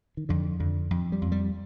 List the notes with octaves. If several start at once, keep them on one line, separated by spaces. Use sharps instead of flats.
D#3
F2 D3
F2 D3
F2
G3
F2
G3